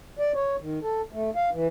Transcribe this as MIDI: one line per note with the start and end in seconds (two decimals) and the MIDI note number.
0.19 0.32 74
0.35 0.56 73
0.60 0.79 51
0.83 1.01 69
1.12 1.30 57
1.35 1.50 77
1.53 1.67 52